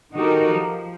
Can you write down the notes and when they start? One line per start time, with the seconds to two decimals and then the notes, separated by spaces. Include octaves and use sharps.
0.14 D#3 D#4 F#4 G4 A4 A#4
0.54 F3